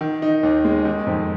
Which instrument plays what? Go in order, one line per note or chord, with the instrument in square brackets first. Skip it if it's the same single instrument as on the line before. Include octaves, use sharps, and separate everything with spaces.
[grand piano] D#3
D#4
D#2
G#3
D#3
F2